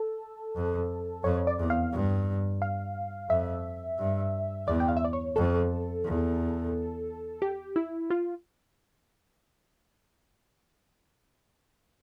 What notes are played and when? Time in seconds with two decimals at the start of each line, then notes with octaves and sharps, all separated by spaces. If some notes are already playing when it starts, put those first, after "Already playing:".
Already playing: A4
0.55 F2
1.24 F2 C#5
1.47 D5
1.59 E2
1.70 F5
1.92 G2
2.62 F5
3.30 F2 E5
3.98 G2
4.67 E2 D5
4.80 G5
4.88 F5
4.97 E5
5.05 D5
5.13 C#5
5.36 F2 A4
6.05 E2
7.42 G4
7.76 E4
8.10 F4